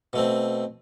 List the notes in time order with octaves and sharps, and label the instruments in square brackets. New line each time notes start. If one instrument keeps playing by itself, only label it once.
[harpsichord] B2 A3 C4